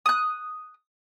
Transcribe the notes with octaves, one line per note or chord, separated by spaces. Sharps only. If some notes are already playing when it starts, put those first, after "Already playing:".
D#6 F#6